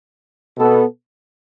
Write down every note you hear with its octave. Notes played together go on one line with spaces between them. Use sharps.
B2 B3 A4